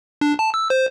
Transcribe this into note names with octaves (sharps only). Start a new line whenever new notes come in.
D4
A5
E6
C5